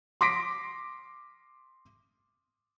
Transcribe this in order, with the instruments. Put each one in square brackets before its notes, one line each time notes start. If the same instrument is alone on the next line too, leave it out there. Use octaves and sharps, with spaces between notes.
[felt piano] C6 D6 A#6 B6 D7